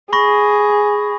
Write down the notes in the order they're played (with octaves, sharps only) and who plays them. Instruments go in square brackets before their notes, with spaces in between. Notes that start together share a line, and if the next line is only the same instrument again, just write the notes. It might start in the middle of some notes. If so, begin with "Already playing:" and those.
[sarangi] G#4 [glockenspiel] B5 C#6 A#6